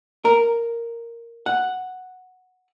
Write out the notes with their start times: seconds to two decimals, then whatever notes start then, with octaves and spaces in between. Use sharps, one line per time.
0.25 A#4
1.46 F#5